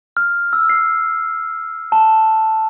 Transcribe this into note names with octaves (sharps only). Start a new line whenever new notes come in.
F6
E6
C7
A5